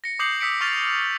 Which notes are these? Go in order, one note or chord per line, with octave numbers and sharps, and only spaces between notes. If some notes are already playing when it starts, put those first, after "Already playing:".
A#6 C#7
D6 D#6 G6 C7 C#7 F#7
D#6 E6 B6 C#7 D7
C#6 F6 A6 F7